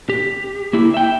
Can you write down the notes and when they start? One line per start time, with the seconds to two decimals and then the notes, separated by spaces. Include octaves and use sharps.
0.09 G4
0.73 A#3 E4
0.94 E5 G5